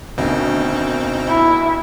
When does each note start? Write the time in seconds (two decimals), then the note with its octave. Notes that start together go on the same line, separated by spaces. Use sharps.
0.18 D2 B2 D#3 C4 D#4
1.28 E4